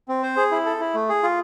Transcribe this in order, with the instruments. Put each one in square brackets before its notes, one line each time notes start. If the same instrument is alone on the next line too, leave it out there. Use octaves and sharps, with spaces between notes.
[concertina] C4
C5
G#4
E4
A4
E4
A3
G#4
F4